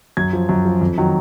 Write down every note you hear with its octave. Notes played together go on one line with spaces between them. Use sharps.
F#2 G#6
F3
F#2
F3
F2
D#3 F#3